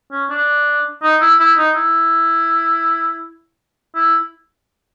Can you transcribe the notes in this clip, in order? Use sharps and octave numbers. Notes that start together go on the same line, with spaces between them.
C#4
D4
D#4
E4
E4
D#4
E4
E4